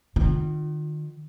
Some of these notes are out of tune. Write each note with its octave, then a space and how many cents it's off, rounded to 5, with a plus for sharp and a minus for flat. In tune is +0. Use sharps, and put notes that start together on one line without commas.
D#3 -35 F4 +25